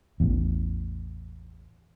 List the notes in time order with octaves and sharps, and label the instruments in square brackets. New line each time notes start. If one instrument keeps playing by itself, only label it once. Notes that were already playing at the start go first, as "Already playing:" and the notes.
[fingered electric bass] A1 E2